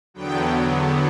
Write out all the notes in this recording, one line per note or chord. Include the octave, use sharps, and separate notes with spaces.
E2 D3 F#3 B3 G5